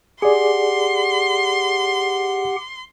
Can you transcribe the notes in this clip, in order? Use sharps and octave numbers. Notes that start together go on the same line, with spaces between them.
G4 G#4 D5 F#5 C6